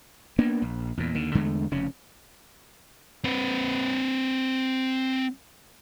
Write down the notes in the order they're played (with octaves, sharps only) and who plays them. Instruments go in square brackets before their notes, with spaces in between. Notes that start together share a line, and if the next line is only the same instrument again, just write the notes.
[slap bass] A#3 B3 D4
A#1
E2 A#2
D#2 D3
E2 D3 G#3 A3
F1 C#3 C#4
[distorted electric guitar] C4 B4